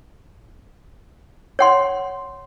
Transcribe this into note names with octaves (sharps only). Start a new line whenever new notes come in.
C#5 F#5 C6